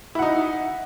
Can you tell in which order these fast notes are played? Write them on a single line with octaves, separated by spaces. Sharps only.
E4 F#5 D#4